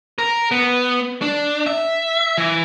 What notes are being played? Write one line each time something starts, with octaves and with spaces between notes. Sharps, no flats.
A#4
B3
D4
E5
E3